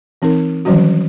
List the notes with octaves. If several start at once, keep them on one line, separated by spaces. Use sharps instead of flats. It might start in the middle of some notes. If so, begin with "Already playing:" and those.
E3 C4 D#4 A#4
D#3 E3 F#3 G3 C#4 F#4